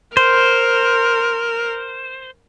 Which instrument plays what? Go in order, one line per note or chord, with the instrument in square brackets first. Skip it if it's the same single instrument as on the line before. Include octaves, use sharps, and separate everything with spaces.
[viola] A#4 [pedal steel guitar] C5